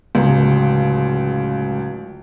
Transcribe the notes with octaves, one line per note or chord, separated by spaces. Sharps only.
D1 C#2